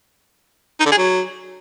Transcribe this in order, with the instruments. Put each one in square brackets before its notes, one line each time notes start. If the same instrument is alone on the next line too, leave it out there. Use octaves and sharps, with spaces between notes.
[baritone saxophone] D#4
D3
G#4
F#3